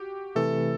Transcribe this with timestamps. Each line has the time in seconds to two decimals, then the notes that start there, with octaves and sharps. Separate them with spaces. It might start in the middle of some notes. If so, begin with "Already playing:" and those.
Already playing: F#4 G4
0.35 C3 E3 A3 A4